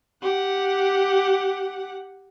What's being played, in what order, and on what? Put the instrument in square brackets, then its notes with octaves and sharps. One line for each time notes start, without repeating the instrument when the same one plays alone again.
[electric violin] G4 F#5